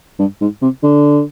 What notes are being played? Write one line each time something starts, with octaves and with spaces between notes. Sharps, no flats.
G2
G#2
C3
D3